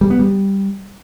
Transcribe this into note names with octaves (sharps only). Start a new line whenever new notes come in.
G3
B3
G3